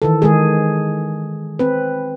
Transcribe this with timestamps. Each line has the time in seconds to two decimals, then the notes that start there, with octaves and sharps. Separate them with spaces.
0.02 D#3 E3 A4
0.22 D#3 G#3 G#4
1.59 C4 B4